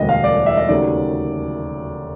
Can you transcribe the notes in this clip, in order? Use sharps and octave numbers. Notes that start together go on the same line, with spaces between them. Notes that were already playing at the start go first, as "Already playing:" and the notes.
Already playing: E1 D2 D3 G3 D#5
F5
D5
E5
D#5
D#2 C#3 F#3 A3 D5